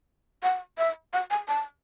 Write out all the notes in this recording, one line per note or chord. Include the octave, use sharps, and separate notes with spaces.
F#5
E5
F#5
G#5
A5